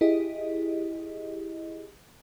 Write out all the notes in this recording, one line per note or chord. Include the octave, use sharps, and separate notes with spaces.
E4 G4 G#4 D#5